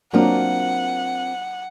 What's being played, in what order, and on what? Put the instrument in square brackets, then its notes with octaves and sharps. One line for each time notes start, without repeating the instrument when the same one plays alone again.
[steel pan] F#3 A#3 D4 [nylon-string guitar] C4 F4 A#4 [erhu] F#5